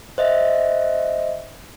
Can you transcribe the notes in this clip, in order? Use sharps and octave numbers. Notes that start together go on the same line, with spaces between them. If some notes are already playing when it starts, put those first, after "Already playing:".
C5 D#5 E5